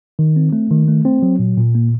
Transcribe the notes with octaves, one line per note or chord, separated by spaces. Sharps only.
D#3
C4
A3
D#3
A3
C4
F#3
A#2
A#2
A#3